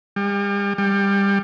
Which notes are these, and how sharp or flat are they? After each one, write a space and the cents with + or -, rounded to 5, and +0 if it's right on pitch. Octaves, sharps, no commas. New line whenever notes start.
G3 +40
G3 +20